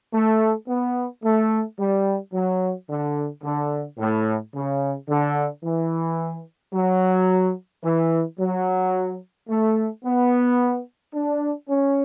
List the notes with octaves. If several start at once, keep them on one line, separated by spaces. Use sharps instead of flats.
A3
B3
A3
G3
F#3
D3
D3
A2
C#3
D3
E3
F#3
E3
F#3
A3
B3
D4
C#4